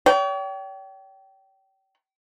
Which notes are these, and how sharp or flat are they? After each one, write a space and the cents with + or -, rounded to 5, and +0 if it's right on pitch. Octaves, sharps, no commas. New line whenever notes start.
C#5 +40 G5 -25